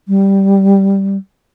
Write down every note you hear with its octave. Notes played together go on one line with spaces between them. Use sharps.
G3